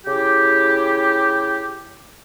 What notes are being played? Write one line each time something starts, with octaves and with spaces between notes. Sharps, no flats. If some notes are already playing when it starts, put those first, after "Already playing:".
C#3 E4 G4